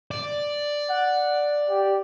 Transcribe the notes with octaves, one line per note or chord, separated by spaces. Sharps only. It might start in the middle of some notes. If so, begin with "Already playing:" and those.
D5
F#5
G4